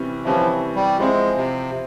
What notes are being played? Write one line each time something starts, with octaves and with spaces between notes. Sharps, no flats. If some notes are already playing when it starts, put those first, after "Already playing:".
Already playing: C3 E3 G3 C#4
C3 E3 F3 G3 C#4 E4
G3
F3 G#3 C4 E4
C3